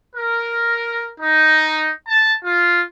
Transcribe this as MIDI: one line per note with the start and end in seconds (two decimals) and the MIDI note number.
0.15 1.10 70
1.19 1.89 63
2.07 2.33 81
2.44 2.81 65